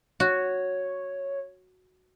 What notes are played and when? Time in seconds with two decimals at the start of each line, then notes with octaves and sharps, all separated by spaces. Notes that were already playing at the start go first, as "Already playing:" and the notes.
0.20 F#4 C#5